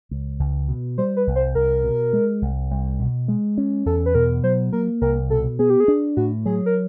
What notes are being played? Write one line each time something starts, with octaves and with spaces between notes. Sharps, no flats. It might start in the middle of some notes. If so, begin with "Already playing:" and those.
C#2
C#2
B2
G3 C5
B4
C2
C5
C2 A#4
B2
G#3
C2
C2
B2
G#3
C#4
E2 A4
B4
B2 A#4
F#3 C5
A#3 A#4
C2 A#4
B2 A4
B3 G#4
G4
G#4
D4
A2 F#4
F#3 G#4
A#4